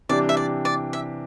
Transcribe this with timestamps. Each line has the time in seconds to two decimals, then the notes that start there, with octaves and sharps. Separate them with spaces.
0.09 C3 E3 G3 D4 D5
0.29 E5
0.37 D5
0.65 D5
0.93 E5